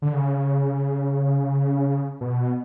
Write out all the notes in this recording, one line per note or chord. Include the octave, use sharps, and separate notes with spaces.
D3
C#3
B2